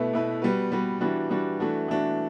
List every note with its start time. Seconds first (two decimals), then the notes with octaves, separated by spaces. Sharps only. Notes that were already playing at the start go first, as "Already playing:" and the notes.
Already playing: B2 A3 E4 B4
0.13 B2 A3 E4 B4
0.42 G3 B3 F#4 B4
0.72 G3 B3 F#4 B4
1.01 E3 G3 D4 F#4
1.30 E3 G3 D4 F#4
1.60 E3 A3 D4 F#4
1.88 E3 A3 D4 F#4